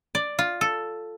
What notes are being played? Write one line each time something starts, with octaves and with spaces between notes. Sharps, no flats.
D5
F4
A4